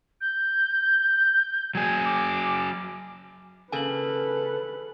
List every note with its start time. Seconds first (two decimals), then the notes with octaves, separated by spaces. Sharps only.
0.21 G6
1.75 F#3 G#4 G#6
2.05 D6
3.72 C#3 A#3 A4 B4 G#5 F#7